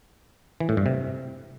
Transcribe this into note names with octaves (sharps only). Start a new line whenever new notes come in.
E3
A2
G2
C3